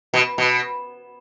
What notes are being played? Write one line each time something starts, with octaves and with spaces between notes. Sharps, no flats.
B2
B2